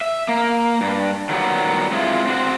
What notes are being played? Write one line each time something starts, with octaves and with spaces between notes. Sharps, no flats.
E5
A#3
G2
D#3 F#3 G3 B3
G#3 C4 E4 F4
C4 F#4 C5